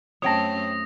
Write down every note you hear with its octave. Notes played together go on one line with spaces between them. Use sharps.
F#2 A3 C4 C#5 G5 A5 D#6 A#6